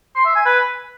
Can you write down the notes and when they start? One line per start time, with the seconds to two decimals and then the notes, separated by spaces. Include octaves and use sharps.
0.15 C6
0.25 E5
0.36 G#5
0.46 B4